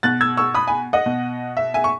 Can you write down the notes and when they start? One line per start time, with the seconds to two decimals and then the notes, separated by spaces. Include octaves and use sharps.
0.03 B2 F#6 A6
0.21 E6 G#6
0.37 C#6 E6
0.54 B5 D#6
0.67 G#5 B5
0.93 D#5 F#5
1.06 B2
1.57 E5
1.74 E5 G#5
1.84 C#6